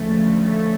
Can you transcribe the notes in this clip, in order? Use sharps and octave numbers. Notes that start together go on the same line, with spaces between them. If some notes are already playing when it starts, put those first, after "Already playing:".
Already playing: D2 C#3 F3 A3
A3